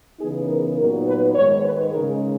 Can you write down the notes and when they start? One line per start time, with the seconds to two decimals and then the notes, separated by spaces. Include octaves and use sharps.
0.20 C#3 E3 B3 D#4 G#4
0.48 A#4
0.77 A#2 F#3 B3 D#4 A#4
1.07 B4
1.35 G#2 D#3 G#3 C#5
1.64 B4
1.93 C#3 G#3 D#4 A#4